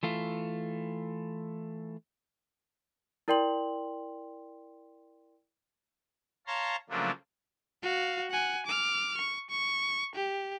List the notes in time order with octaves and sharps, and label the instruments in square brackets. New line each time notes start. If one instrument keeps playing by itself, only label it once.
[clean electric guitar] E3 A3 F4
[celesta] E4 A#4 D5 G5 C6 F#7
[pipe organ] C#5 F5 A5 A#5 C6
C#3 F3 F#3 A3 A#3 D4
[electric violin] F#4 F5
F#5 G#5
D6 F6
C#6
C#6
G4